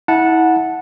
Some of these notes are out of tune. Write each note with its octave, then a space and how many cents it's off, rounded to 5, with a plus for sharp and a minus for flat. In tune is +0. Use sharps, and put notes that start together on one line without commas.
E4 -30 F#5 -10 A5 +0